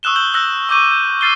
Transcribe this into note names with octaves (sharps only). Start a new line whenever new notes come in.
C#6 D#6 E6 F#6 E7 G7
E6 G6 E7 F#7 G7
D#6 E6 F#6 A#6 F#7
C#6 D6 G6 D#7
G6
E6 F6 A6 C7 D#7 G7